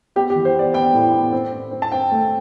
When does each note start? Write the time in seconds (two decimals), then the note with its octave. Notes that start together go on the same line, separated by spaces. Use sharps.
0.16 B3 G4
0.30 G4
0.36 E3
0.45 C5
0.55 B3 D5
0.74 B3 G5
0.93 A2
1.13 B3
1.33 C4
1.52 C4
1.71 C4
1.82 A5
1.92 C4 G5
2.11 A3